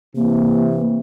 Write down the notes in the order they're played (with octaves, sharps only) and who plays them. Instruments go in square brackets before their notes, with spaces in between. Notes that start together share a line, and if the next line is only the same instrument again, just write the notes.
[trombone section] C3 E3 [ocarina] A#3